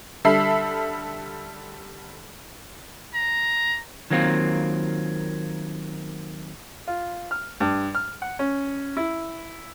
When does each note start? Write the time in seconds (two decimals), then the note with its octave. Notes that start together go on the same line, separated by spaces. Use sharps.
0.24 D3 G3 A4 E5 B5 C7
3.14 A#5
4.10 D#3 F#3 A#3 C4 F4
6.87 F4
7.31 F6
7.60 G2
7.95 F6
8.22 F#5
8.39 C#4
8.97 E4